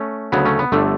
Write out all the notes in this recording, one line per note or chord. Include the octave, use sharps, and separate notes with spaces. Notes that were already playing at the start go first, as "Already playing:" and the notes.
Already playing: A3 C#4
D2 C#3 F#3 B3
A3 C#4
B3
G1 D3 A3